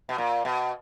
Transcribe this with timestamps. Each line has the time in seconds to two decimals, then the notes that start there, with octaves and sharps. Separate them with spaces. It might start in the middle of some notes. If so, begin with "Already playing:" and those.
0.09 B2
0.18 A#2
0.45 B2